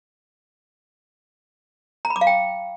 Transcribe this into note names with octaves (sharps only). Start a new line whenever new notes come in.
A#5
B5
D6
F5
G5